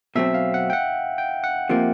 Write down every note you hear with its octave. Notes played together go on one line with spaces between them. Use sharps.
B2 F#3 A3 C4 E5
F5
F#5
G5
F#5
G5
F#5
C3 F3 A#3